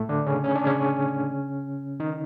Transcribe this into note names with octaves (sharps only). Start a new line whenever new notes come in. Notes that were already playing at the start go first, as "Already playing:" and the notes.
Already playing: A2 A3
D3 D4
C#3 C#4
C#4
D4
C#3 C#4
D#3 D#4